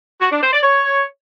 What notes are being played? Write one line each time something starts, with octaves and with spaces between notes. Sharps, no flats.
F#4
D4
C5
D5
C#5